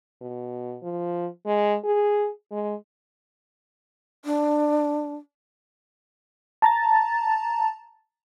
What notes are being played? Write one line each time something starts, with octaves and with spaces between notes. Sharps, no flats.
B2
F3
G#3
G#4
G#3
D4
A5 A#5 A6